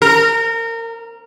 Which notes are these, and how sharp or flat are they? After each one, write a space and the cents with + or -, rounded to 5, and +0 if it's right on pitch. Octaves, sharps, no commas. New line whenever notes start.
A#4 -25